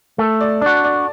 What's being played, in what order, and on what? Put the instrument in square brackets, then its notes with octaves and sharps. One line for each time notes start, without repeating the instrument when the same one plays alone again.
[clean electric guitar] A3 [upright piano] A4
[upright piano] D5
[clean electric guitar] D4 F#4 [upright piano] D5
[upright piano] D5